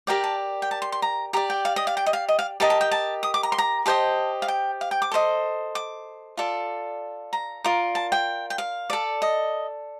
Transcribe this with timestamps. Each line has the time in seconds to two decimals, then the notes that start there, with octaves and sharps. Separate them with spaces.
0.07 G4 A#4 D5 G5
0.24 A5
0.62 G5
0.71 A5
0.82 C6
0.92 C6
1.02 A#5
1.33 G4 D5 A#5
1.50 G5
1.65 F5
1.76 D#5
1.87 F5
1.97 G5
2.06 D#5
2.13 F5
2.29 D#5
2.39 F5
2.60 G4 A#4 D#5 A5
2.70 A5
2.81 G5
2.91 A5
3.23 D#6
3.34 D6
3.43 A#5
3.52 C6
3.58 A#5
3.86 G4 C5 D#5 A5
4.42 F5
4.48 G5
4.81 F5
4.91 G5
5.02 D6
5.12 A4 C5 D#5
5.75 D6
6.37 F4 A4 D5
7.33 A#5
7.64 F4 A#4 D5
7.95 A5
8.12 G5
8.50 G5
8.58 F5
8.90 A4 D5
9.22 D#5